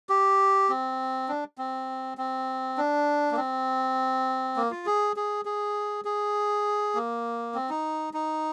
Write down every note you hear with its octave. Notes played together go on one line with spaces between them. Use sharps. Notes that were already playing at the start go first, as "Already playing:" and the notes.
G4
C4
D4
C4
C4
D4
A#3
C4
A#3
F4
G#4
G#4
G#4
G#4
A#3
C4
D#4
D#4